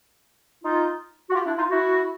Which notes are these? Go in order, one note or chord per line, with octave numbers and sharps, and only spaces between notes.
D#4 F4
F#4
F4 G4
D4 E4
D#4 F4
E4 F#4